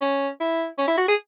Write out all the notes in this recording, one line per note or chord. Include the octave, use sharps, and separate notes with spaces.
C#4
E4
C#4
E4
F#4
G#4